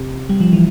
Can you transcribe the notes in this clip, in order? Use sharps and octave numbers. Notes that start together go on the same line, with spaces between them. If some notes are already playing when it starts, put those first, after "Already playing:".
Already playing: C3
G3
F3
E3